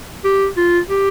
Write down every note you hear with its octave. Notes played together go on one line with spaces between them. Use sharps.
G4
F4
G4